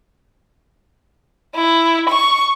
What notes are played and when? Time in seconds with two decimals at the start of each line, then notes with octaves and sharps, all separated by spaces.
1.55 E4
2.09 C#6